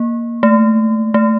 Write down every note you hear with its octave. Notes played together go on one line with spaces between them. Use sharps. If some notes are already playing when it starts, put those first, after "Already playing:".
Already playing: A#3
A3
A3